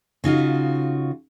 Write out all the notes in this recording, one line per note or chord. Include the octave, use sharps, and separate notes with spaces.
C#3 D#4 F4 F#4